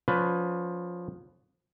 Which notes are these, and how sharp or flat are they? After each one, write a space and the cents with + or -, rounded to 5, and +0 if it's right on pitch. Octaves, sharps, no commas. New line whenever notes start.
F3 +20 C#4 +35 B4 +15